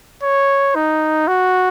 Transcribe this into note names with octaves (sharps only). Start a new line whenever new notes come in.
C#5
D#4
F#4